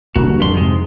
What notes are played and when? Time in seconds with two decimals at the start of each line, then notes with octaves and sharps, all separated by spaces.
0.16 F#1 C2 D3 A#3 F#4
0.27 D2 G2
0.40 F2 A2 D3 F3 C6
0.54 F2 G#2 C3 G#3